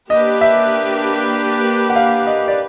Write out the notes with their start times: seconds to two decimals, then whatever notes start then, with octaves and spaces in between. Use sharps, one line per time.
0.10 A#3 D4 G4 B4 D#5
0.41 E5
1.89 F#5
1.96 F5
2.27 D#5
2.48 D5